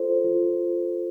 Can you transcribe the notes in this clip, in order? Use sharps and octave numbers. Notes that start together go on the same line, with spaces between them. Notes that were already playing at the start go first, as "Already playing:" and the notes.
Already playing: F4 A4 C5
F4